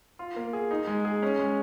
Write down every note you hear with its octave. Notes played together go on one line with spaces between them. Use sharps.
F4
A#3
G#4
D#4
G#3
G#4
C#4
G#3